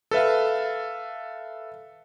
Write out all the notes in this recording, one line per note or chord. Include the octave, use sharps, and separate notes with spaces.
A4 B4 E5 F5